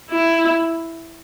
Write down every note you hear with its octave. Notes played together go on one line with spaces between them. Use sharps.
E4